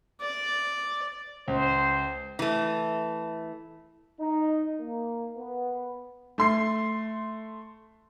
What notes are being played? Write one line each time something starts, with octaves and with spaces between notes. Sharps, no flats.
D5
C#2 C5
E3 A3
D#4
A#3
B3
A3 C6 C7